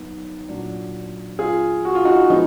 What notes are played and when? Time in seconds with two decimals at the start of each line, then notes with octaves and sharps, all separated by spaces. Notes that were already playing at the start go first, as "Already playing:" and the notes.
Already playing: D#3 F#3 B3
0.49 A#2 F#3 D4
1.39 F4 G#4
1.85 F#4
1.95 F4
2.05 D#4 F#4
2.30 D3 F3 G#3 B3 D#4